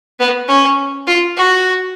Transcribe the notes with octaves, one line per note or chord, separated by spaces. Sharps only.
B3
C#4
F4
F#4